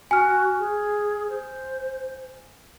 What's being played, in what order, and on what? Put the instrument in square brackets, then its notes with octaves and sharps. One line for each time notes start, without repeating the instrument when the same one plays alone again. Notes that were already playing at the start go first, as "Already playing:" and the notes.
[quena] F#4 [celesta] G#5 F6
[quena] G#4
C5